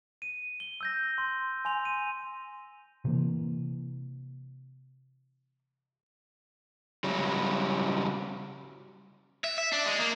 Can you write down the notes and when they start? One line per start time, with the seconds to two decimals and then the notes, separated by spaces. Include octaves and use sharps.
0.22 D#7
0.60 G7
0.81 E6 G6 A#6
1.18 C6
1.65 G#5 C6 F7
1.85 D#7
3.05 C3 E3 A#3
7.04 C#3 F#3 G3
9.44 E5
9.58 E5
9.73 D4
9.86 G#3
10.00 A#3